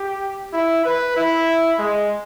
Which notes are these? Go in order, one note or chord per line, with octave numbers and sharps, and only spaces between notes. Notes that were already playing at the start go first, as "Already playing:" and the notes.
Already playing: G4
E4
B4
E4
G#3